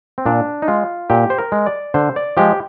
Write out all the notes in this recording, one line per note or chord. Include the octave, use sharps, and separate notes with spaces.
C4
A#2 D4
D#4
G#3 F4
A#2 G4
C5
A#4
G#3
D5
D3 C5
D5
F3 G#3 G4